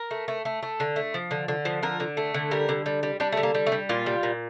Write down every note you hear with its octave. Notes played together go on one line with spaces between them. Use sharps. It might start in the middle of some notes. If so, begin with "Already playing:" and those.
Already playing: A#4
A3
A3
A3
A3
D3
A3
F3
D3
D3
F3
D3 A#4
D3
A3
D3
G3 A#4
D3
G3
G3
G3 D4
D3 A3
A#3
G3
A3
G3
A#2 F4
G3
A#2